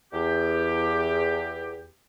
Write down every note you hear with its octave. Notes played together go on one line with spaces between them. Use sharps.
E2 G4